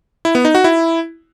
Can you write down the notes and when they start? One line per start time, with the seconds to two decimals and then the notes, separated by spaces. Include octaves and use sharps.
0.25 E4
0.35 B3
0.45 D#4
0.55 F#4
0.64 E4